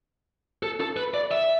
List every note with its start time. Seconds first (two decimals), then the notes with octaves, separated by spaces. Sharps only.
0.63 A4
0.80 A4
0.97 B4
1.14 D5
1.31 E5